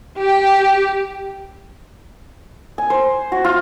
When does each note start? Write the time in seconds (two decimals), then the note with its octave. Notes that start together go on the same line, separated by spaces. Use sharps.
0.18 G4 G5
2.78 G#5
2.90 C5
3.32 F#4
3.45 F4